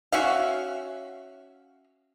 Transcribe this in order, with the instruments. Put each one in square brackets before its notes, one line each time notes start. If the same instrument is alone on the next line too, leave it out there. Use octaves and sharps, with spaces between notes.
[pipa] C#4 F#4 E5 F5